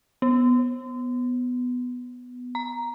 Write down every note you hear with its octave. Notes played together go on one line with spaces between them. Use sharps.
B3
A#5